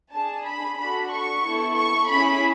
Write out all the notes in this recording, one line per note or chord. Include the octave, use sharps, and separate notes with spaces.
D4 G#4 A5
B5
D4 F#4 A4 B5
C#6
B3 E4 A4
C#6
C#4 E4 G#4 B5